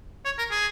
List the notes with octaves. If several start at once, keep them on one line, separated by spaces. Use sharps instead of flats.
C#5
A#4
G#4